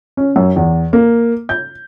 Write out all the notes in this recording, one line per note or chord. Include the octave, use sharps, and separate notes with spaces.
C#4
F#2
E2
A#3
G6